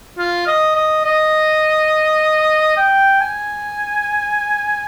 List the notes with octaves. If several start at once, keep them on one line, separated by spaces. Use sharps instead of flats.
F4
D#5
D#5
D#5
G5
G#5